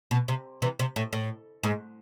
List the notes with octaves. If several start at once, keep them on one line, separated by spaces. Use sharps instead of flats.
B2
C3
C3 E3
C3
A2
A2
G#2